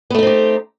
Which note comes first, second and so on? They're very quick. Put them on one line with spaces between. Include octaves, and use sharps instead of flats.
B3 A3 D#4 C4 G4